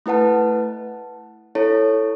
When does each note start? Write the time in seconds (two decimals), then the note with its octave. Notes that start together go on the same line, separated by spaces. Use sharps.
0.06 A3 E4 B4 F#5 A5
1.55 E4 A4 C#5